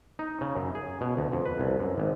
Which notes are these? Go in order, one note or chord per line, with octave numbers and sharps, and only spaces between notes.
D#4
C#3
F#2
G#4
B2
D2
F2
B4
C2
F#2
G#1